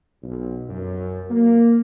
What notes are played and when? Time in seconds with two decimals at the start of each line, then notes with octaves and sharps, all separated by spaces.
0.23 B1
0.69 F#2
1.31 A#3